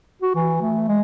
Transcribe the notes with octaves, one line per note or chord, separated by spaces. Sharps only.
F#4
E3
A3
G#3